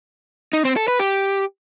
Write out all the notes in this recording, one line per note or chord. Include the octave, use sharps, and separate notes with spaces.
D#4
C4
A4
B4
G4